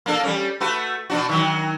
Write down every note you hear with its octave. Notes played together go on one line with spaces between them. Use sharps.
A#3 D4 A4
G3 C#4
A3 F#4 B4
B2 D4 F#4
D#3 F#3